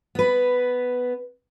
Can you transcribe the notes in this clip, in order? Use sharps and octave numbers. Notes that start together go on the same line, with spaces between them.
B3 B4